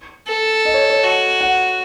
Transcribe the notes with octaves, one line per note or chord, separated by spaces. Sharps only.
A4
D#5
C#5
C#5
F#4
F#5